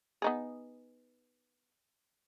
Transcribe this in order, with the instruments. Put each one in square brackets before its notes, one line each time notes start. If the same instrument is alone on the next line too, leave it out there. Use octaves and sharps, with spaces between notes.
[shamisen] B3 D#4 G#4